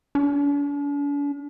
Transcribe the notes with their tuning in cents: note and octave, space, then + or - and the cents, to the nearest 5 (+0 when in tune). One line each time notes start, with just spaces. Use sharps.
D4 -45